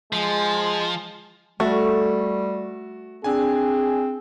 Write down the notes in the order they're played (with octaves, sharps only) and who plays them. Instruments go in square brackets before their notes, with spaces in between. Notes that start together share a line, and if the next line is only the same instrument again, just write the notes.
[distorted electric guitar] F3 [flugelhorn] G#3
[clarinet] G3 [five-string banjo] A3 [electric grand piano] F#4
[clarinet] C4 [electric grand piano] D4 G#5 [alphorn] G#4